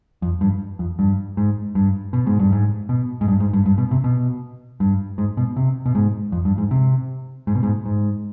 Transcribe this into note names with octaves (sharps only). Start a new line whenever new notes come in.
F2
G2
F2
G2
G#2
G2
B2
G#2
G2
G#2
B2
G#2
G2
G#2
G2
G2
B2
C3
B2
G2
G#2
B2
C3
B2
G#2
F2
G2
G#2
C3
G#2
B2
G#2
G#2